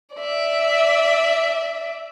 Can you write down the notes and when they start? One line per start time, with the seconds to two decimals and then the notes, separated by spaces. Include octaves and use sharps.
0.15 D5 E5